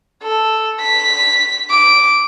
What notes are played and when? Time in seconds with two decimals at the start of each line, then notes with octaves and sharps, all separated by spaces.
0.23 A4
0.80 B6
1.70 D6